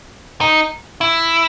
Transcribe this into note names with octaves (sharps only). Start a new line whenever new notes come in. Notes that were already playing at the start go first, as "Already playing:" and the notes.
D#4
E4